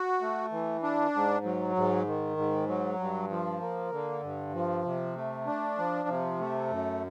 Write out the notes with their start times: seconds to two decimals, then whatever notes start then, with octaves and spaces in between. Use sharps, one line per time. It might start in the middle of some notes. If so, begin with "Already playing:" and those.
Already playing: F#4
0.21 A3
0.52 E3
0.83 D4
1.14 G#2
1.45 F#3
1.76 G#2
2.07 D#3
2.37 G#2
2.68 F#3
2.99 G2
3.30 F3
3.61 A#3
3.92 D3
4.23 G2
4.54 F3
4.85 C3
5.15 A3
5.47 D4
5.78 F3
6.09 C3
6.40 A3
6.71 F#2